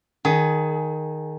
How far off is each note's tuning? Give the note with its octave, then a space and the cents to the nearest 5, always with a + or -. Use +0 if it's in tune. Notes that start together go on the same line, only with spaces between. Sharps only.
D#3 +0 G#4 +15